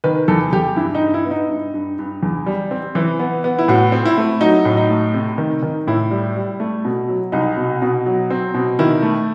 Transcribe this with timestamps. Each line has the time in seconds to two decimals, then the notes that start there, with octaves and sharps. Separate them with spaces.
0.04 D#3 B4
0.28 E2 A4
0.53 E2 G4
0.76 G2 E4
0.95 D#4
1.01 G2
1.14 E4
1.25 B3
1.31 D#4
1.50 G2
1.74 G2
1.99 G2
2.23 E2
2.46 G3
2.71 C4
2.95 E3 E4
3.19 B3
3.44 B3
3.59 E4
3.68 A2 F#4
3.92 C4
4.05 E4
4.18 A3
4.41 F#3 D#4
4.65 A2
4.77 D#4
4.90 A3
5.14 C3
5.38 D#3
5.63 D#3
5.87 A2 E4
6.11 G3
6.36 G3
6.60 A3
6.85 B2
7.08 F#3
7.32 C2 D#4
7.57 B2
7.82 B2
8.06 F#3
8.30 C4
8.54 B2
8.79 D#3 E4
9.02 A3